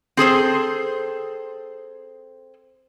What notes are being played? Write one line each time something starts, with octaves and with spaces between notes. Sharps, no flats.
C4 G#4 A4 C5